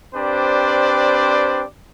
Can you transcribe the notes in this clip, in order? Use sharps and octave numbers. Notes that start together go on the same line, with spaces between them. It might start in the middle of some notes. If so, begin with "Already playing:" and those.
C4 D4 G4 B4 C5 D5